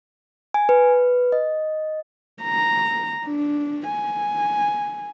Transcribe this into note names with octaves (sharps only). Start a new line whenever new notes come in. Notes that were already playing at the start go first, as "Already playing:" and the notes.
G#5
B4
D#5
A#5
D4
G#5